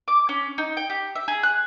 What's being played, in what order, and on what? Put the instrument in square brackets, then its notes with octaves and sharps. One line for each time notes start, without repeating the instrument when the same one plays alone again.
[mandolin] D6
C#4
D#4
G5
G4
E5
G#4
F#6